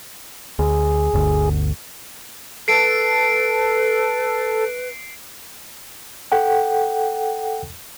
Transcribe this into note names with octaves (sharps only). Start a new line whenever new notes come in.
D2 G#4
G1 D2
A4 B4 C7 D7
A4 F#5 G5